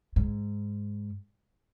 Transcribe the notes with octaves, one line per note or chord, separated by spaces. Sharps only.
G#2